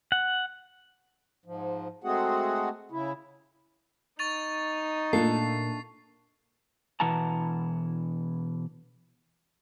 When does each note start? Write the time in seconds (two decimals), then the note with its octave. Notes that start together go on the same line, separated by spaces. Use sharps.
0.12 F#5
1.46 G#2 F3
2.04 G#3 A3 C4 F#4 G#4 F#5
2.92 C#3 E4
4.19 D#4 C#6 A6 F7
5.13 A#2 A3 A#3 D4 A4 C7
7.00 B2 E3 E4 F#5 A5 A#5